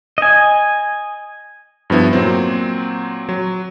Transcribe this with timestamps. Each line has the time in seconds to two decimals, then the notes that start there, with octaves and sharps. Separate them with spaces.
0.18 D#5 G#5
1.90 G2 F3 B3 E4
2.13 A#2 F#3 C4
3.29 F#3